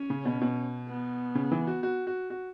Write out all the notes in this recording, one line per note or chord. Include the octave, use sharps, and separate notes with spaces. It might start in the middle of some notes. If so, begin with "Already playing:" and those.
Already playing: C#4
C#3
B2
B2
B3
C#3
E3
F#4
F#4
F#4
F#4